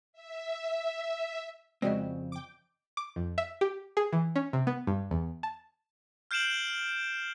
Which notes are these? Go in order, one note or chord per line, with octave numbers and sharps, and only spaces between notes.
E5
F2 C#3 G#3 C4 F#4 D5 D#5
G5 D6
D6
F2
E5
G4
G#4
E3
C#4
C3
B3
G2
E2
A5
F6 G6 C7 D7 E7 F#7